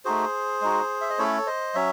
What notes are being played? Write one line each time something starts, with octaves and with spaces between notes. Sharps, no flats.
A3 D#4 F#4 G#4 C5
G#3 D#4 F#4
E5
D#5
A3 C#4 E4 A4 C#5
C5 D#5
F#3 C#4 C#5 E5